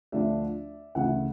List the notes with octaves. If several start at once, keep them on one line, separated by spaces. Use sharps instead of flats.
D2 D3 F3 A3 D4 D5 E5
D2 C#3 E3 E5 F#5